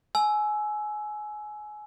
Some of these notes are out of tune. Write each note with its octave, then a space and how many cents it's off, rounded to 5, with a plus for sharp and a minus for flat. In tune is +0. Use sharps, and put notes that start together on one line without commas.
G#5 +25 E6 +0